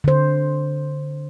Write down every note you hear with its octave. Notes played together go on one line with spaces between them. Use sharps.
D3 C5